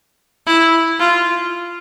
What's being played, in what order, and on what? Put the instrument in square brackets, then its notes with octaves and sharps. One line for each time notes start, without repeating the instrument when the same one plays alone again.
[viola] E4
F4